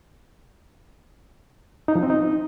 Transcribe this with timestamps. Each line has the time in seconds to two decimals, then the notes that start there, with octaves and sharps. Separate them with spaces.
1.88 D#4
1.95 F3
2.03 C4
2.10 D#4